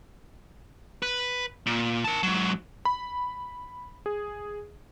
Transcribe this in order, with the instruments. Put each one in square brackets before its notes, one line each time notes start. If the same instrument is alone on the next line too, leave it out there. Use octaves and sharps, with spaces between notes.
[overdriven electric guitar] B4
A#2
A#4 A5
G#2 F#3
[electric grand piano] B5
G#4